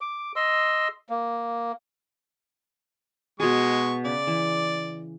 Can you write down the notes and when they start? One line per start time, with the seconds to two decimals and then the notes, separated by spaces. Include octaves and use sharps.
0.01 D6
0.36 D#5 C6 E6
1.09 A#3
3.40 B2 G#3 G#4 C#6
4.05 C#3 D5
4.27 E3